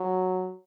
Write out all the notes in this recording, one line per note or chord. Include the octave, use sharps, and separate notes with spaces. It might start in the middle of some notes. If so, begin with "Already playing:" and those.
Already playing: F#3